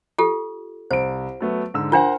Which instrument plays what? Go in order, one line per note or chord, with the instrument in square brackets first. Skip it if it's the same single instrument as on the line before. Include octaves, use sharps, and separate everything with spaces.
[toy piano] F4 G4 A4
[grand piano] C2 D7 [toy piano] C5
[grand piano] F#3 A3 B3
G#2 D3 E6
[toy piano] D4 F4 [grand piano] A#4 C5 F#5